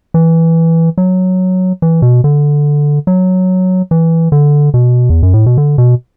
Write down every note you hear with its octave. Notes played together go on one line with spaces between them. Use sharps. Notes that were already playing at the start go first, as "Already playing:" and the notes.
E3
F#3
E3
B2
D3
F#3
E3
D3
B2
E2
F#2
A2
B2
D3
B2